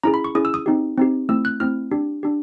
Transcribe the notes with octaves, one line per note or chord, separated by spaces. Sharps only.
C#4 E4 G#4 A#5
B5
C#6
C#4 E4 G#4 D#6
E6
D#6
C4 D#4 G4
C4 D#4 G4
A3 C4 E4 E6
F#6
A3 C4 E4 F6
D4 G4
D4 G4